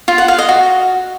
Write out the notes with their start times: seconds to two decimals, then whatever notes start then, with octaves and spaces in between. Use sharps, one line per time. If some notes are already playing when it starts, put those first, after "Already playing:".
0.08 F4
0.18 F#5
0.28 F5
0.38 D#5
0.49 F#4